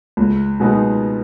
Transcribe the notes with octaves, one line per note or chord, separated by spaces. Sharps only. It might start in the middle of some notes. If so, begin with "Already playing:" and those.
C#2
B2 G#3 B3 D#4